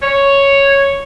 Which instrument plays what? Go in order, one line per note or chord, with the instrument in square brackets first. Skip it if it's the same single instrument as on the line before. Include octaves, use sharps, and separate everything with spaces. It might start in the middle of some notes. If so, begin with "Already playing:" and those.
[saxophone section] C#5